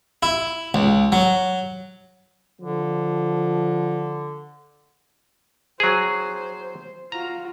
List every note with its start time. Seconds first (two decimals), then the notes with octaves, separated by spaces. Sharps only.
0.23 E4
0.74 C#2
1.12 F#3
2.61 D3 F3
5.80 F#3 G#4 C5
7.12 F4 F#4 A#5